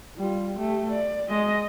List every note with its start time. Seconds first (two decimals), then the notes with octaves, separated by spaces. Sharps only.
0.18 G3 F4
0.59 A3 G4
0.92 D5
1.30 G#3 D#5